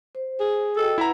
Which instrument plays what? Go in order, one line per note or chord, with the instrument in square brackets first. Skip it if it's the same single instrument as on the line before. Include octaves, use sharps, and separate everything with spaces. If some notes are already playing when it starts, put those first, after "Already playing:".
[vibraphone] C5
[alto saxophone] G#4
[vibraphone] F#4 D#5 G5 [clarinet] A4
[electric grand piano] E4 E5 A#5 [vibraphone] B4 F#5